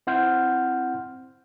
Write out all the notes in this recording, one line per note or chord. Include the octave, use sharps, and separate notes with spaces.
C4 E4 F#5 C6 F6 G6